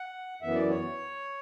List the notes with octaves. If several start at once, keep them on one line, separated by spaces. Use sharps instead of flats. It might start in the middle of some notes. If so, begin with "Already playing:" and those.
Already playing: F#5
F#2 E3 B3 E5
D5
C#5